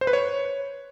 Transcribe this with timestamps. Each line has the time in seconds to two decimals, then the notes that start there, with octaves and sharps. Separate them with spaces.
0.01 C5
0.07 B4
0.13 C#5